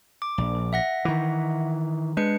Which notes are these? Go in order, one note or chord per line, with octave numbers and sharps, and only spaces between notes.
D6
A#1
E5 F#5 A#6
D#3 E3
G#3 D4 B4 C#7